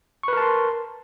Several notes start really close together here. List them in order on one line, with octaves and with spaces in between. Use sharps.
C#6 B4 A#4 A5 C6